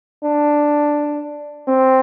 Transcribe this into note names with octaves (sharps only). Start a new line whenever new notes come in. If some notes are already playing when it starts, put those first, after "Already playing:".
D4
C4